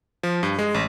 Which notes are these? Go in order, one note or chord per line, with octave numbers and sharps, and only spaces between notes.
F3
G2
G#3
A1